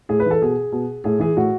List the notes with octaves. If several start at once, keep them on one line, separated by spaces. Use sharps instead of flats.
A2 G#4
B4
E3 A4
B2 G#4
B2
A2 G#4
E3 G#4
A2 F#4